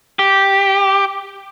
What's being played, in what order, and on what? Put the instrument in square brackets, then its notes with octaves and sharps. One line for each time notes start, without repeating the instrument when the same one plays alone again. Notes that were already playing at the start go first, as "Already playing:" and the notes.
[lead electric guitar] G4